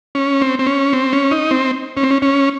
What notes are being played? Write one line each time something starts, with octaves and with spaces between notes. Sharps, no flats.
C#4
C4
C4
C#4
C4
C#4
D#4
C4
C#4
C4
C#4
C#4